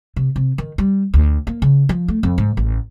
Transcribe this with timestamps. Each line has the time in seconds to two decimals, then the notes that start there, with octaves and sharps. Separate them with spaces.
0.16 C3
0.36 C3
0.58 D#3
0.78 G3
1.14 D2
1.47 A#3
1.62 C#3
1.89 F3
2.08 A3
2.23 F2
2.38 G#2
2.57 A1